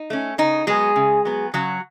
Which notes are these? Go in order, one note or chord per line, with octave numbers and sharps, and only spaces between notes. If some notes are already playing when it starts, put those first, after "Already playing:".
Already playing: D#4
A3 C#4
C#3 D#4
F#3 G#3 B3 G#4
C#3
F#3 B3
C#3 F#3 F#4